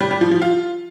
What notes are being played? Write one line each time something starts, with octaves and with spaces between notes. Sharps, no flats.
G3
G3
F3
F3
F4